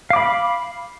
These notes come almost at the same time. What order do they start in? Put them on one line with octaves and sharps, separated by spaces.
F5 D6 B5